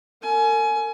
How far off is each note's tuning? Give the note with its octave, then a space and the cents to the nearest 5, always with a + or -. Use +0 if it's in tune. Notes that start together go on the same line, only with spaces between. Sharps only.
A#4 -45 G#5 +25